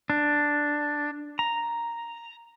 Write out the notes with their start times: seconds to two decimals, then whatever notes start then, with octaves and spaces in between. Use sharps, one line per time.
0.10 D4
1.39 A#5